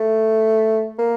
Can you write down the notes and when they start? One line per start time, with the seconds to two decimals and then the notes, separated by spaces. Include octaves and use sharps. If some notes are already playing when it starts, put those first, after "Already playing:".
Already playing: A3
0.99 A#3